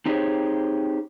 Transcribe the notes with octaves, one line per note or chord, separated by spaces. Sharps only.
C4 D#4 G4 G#4 C5 C#5